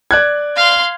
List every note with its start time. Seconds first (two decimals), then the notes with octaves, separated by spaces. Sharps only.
0.11 D5 F#6 G#6
0.56 F5 C6